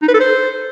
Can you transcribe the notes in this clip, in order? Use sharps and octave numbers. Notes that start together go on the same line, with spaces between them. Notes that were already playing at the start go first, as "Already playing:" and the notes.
D#4
B4
A4
C5